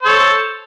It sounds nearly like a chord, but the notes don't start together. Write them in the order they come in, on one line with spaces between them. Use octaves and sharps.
C5 A4 C#5